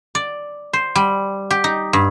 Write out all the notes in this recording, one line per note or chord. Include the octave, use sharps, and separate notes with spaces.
D5
C5
G3
G4
D#4
G2